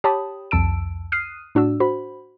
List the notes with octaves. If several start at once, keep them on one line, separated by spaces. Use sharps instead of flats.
G4 C#5 A5 B5 D#6
C2 F2 A5 E6 D7
D#6 F6 F#6 C7 D#7
A2 D4 F#4 E6
F#4 C5 B5